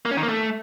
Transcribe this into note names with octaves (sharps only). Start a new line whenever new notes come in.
A#3
C#4
D#3
A#3
A3